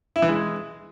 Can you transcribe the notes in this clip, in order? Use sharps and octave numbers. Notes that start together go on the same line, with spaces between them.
E4
E3
G#3